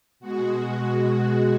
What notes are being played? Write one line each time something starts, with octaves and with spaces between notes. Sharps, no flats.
B2 G#3 F#4